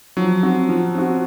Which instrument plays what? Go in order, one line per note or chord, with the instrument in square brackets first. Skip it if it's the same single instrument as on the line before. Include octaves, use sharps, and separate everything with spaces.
[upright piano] F3 [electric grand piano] F#3
[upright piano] C4 F#4
F3
C4 F#4